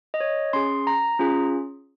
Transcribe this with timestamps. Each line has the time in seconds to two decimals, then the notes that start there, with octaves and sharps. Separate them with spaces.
0.14 D#5
0.20 C#5
0.53 C#4 G#4 C6
0.87 A#5
1.19 C#4 F4 G#4